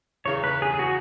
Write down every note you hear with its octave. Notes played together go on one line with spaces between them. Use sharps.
E2 C#3 E3 C#5
B4
G#4
G#4
F#4